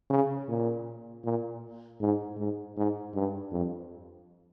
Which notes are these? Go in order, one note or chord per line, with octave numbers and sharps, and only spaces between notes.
C#3
A#2
A#2
G#2
G#2
G#2
G2
F2